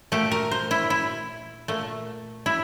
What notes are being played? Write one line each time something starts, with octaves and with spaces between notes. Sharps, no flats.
A#2 A3 G4
A#4
C5
E4
E4
A#2 A3
E4